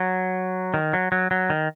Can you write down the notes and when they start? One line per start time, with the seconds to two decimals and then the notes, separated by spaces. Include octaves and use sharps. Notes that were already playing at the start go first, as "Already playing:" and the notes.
Already playing: F#3
0.74 D#3
0.93 F#3
1.12 F#3
1.31 F#3
1.50 D#3